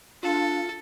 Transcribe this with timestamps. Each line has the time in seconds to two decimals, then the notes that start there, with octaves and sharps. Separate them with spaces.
0.23 D4 F4 A4